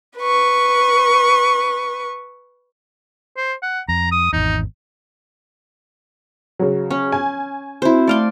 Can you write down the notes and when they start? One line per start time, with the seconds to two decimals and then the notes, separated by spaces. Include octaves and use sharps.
0.19 B4 C#6
3.37 C5
3.63 F#5
3.88 F2 A#5
4.12 D#6
4.33 G#1 E2 D#4
6.59 C#3 F#3
6.91 C#4
7.12 G#5
7.82 C4 E4 F#4 C5
8.08 A3 D5 F5 C6